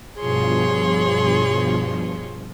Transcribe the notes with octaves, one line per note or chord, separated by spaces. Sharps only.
G2 B2 F3 G#4 C#5 C6